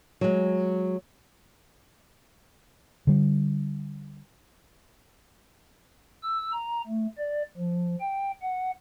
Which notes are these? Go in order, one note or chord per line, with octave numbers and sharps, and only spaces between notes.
F#3 G#3
D3 G3
E6
A#5
A3
D5
F3
G5
F#5